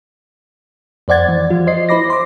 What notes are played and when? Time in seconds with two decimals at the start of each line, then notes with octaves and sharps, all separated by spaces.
1.08 F2 C5 D5 F#5 G#6 A6
1.28 E3
1.50 F3 F4
1.67 C5 D#5 C7
1.89 E4 C5 B5 D6 A#6
2.10 C6 D6